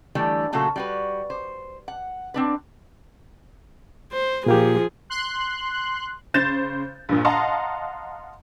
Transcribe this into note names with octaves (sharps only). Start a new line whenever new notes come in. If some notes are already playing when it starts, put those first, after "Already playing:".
D3 E3 G3 A3
A#2 C#3 F#3 A3 F#4 A4
G3 F#4 B4
C5
F#5
C4 D4 B4
C5
A#2 F3 A#3 G4 G#4
C6 F#6
C#3 C5 G6 A6 E7
A#1 G2 A#2
D#5 F5 F#5 A5 A#5 C6